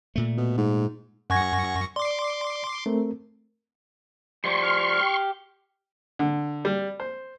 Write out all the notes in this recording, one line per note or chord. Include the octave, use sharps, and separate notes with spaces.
A#2 A3
B2
G#2
F#2 F#5 G#5 C#6 G#6 A#6
D5 C6 D6
A3 C4 A#4
F3 G3 C5 C6 C#6
F6
G4
D3
G3
C5